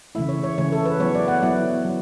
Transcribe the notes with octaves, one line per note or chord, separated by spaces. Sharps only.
C#3 E3 A3 E4 E5
C#5
C#5
C#3 E3 A3 E4 C#5
A4
B4
F#3 B3 E4 C#5
D5
F#5
F#3 B3 E4
F#3